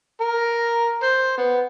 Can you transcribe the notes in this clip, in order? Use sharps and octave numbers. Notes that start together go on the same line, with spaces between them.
A#4
C5
B3